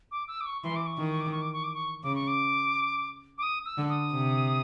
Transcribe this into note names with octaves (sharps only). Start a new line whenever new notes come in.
D6
E6
D6
C#6
E3 C6
D6
C#6
D#3
C#6
D6
C#6
D6
C#6
D6
C#6
C#3 D6
C#6
D6
D6
D#6
E6
D3
D#6
C3